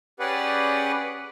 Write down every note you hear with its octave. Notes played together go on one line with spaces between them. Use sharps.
C#4 G4 G#4 B4 D5 F#5